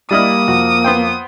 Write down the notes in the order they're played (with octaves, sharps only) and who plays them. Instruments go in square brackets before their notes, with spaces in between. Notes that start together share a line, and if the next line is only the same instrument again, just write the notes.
[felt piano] G3 F6 [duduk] A#3 [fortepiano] D4 E4 D#5 [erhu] D#6
[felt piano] F2 [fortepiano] F#4
[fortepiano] B3 C5 G5